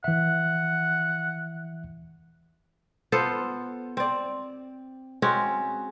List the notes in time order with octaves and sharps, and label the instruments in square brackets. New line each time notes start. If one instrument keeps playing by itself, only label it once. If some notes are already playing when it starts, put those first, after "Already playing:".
[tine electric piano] E3 E5 [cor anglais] F#5
[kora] B3 F4 A4 C5
C4 D5
G#3 C4 C#4 F#4